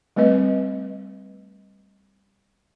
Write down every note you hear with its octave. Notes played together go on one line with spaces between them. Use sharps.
G3 A3 C4 B4 D#5